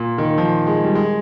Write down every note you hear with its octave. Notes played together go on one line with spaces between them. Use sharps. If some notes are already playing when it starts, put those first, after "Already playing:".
Already playing: A#2
D#3
F3
G#3
G3
G#3